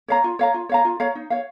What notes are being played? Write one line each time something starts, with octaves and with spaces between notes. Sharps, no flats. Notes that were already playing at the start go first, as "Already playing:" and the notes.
C#5 F5 A#5
F4
C#5 F5 A#5
F4
C#5 F5 A#5
F4
C#5 F5 A#5
D#4
C#5 F5